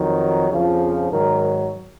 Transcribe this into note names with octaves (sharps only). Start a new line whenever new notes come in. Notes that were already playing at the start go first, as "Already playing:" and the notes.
Already playing: F2 D#3 F#3
F2 C#3 F3
G#2 D#3 F#3 A#4